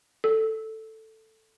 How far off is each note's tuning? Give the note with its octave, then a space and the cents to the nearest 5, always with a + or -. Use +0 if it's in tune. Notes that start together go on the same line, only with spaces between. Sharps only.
A4 +5